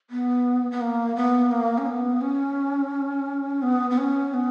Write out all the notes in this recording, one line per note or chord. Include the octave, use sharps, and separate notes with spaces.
B3
B3
A#3
B3
A#3
C#4
B3
C#4
B3
B3
C#4
B3